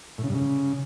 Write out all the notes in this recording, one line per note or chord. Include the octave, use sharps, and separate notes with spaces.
A2
C#3
G2
C#3